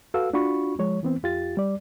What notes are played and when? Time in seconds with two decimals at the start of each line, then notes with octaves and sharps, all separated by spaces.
0.14 F#4 A4 B4 F5 E6
0.33 D4 F4 F#4 B5 C#6
0.79 F3 G#3 C#5
1.03 E3 B3 C4
1.23 F2 F4 G4 A6
1.57 G3 D5